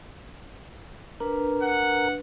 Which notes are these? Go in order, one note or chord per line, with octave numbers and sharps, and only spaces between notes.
D4 A#4 B4
F#5